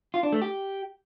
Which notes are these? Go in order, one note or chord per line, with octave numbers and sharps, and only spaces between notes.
F4
D4
A3
G4